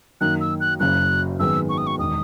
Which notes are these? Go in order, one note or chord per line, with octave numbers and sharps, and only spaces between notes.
F#2 D#3 A#3 D#4 F#6
E6
F#6
F#1 F#2 C#3 F#3 F#6
G#1 F#2 D#3 G#3 B3 E6
C#6
D#6
C#6
E1 D#3 D#6